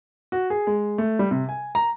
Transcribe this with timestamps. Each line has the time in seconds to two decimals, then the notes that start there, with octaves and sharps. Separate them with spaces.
0.32 F#4
0.50 G#4
0.67 G#3
0.98 A3
1.19 G3
1.31 C3
1.49 G#5
1.75 A#5